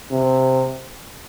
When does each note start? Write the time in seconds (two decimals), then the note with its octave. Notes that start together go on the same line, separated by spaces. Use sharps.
0.11 C3